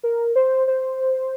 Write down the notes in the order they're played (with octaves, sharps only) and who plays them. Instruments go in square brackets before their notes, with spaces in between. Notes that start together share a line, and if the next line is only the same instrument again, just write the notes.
[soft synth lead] A#4
C5
C5